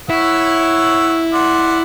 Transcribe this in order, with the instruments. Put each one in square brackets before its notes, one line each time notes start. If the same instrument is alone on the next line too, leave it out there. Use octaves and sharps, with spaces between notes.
[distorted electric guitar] E4 [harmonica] C#5 F#5 E6
[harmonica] D5 F#5 C6